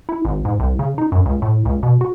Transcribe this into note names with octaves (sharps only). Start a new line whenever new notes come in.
E4
G#1
G#2
C2
C#3
D#4
F#2
C#2
A2
C#2
B2
F#4